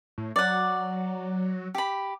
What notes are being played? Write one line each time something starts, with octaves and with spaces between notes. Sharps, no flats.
A2
F#3 D5 F#5
G4 B5